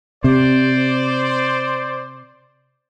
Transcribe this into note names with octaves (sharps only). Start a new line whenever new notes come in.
C3 C5 D5